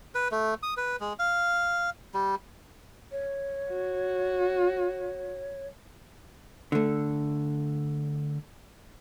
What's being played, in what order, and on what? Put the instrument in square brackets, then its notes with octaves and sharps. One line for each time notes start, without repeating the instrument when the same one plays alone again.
[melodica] B4
A3
D#6
B4
G#3
F5
G3
[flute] C#5
[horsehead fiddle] F#4
[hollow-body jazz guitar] D3 A3